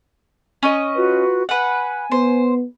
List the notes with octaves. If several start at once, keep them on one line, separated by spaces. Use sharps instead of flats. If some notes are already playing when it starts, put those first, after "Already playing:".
C#4 D#5
F4 F#4 B4
B4 F#5 G#5
B3 C5